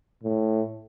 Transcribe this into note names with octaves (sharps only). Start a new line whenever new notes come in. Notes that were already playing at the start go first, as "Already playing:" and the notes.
A2